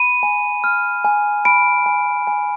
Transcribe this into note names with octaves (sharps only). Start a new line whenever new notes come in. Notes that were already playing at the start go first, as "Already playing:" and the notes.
Already playing: B5 D#7
G#5
F6
G#5
B5 D7
G#5
G#5